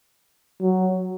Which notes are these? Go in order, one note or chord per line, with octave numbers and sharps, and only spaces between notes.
F#3